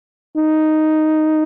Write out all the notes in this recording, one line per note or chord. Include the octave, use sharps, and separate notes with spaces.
D#4